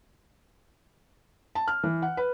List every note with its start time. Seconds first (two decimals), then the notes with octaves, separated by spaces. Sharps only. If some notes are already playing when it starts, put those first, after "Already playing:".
1.55 A5
1.68 F6
1.83 E3
2.02 F#5
2.17 B4